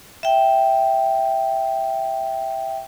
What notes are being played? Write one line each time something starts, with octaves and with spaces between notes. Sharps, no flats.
E5 G5